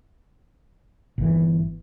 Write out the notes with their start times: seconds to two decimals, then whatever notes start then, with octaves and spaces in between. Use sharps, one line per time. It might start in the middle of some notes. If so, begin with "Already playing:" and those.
1.18 G1 E3